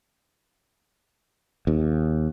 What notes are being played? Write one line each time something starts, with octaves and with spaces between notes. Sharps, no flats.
D#2